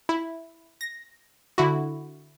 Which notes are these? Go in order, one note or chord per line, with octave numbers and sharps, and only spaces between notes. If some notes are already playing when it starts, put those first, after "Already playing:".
E4
A#6
D3 E4 F#4